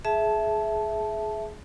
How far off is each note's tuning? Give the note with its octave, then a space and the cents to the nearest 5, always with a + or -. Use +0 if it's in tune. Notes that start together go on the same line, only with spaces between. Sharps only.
G#4 +25 E5 +0 A5 -10